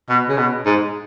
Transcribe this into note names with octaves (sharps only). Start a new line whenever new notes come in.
B2
C#3
B2
G#2